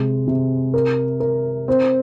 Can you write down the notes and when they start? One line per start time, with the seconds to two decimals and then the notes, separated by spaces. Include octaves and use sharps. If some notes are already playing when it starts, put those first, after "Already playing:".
Already playing: C3 G#3
0.27 C3
0.74 A#4
1.20 A#4
1.68 C4